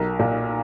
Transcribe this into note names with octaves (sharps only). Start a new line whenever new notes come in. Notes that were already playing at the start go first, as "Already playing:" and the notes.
Already playing: B1 A#4
A#2